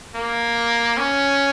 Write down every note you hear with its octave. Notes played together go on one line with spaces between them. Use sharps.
A#3
C#4